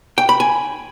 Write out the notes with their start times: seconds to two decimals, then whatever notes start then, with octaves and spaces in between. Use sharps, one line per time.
0.18 G5
0.29 B5
0.40 G#5